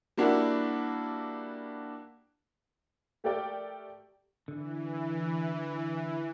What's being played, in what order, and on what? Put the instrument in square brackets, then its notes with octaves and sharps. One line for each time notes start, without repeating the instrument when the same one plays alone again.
[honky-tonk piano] G3 A#3 D4 E4 F#4
A3 G4 A4 A#4 D5 G5
[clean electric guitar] D3 [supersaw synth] E3